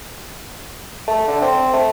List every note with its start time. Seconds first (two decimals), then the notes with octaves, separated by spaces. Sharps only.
1.08 A3
1.28 D3
1.42 C4
1.73 A3